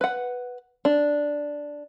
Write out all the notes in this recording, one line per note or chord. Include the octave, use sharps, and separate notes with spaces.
B4 F#5
D4